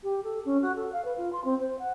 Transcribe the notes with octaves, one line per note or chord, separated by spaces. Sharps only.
G4
A4
C#4
F#4
A4
F5
B4
F4
C6
C4
C5
F#5